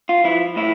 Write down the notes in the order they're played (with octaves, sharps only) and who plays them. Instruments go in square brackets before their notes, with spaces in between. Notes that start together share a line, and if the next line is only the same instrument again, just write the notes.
[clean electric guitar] F4
F3 E4
A2 E4